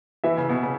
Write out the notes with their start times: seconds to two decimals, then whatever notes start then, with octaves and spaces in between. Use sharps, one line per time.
0.24 E3 E5
0.37 C#3
0.50 B2
0.63 C#3